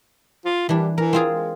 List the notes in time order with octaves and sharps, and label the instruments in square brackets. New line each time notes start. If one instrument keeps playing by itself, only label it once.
[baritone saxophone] F4
[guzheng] E3 D4 [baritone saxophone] G3
[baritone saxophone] E3 [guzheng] A#4
[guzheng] C4 F4 G#4
[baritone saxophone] G#3